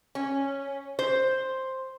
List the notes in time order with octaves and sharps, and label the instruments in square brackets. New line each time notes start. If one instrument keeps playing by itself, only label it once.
[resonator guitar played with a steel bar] C#4
C5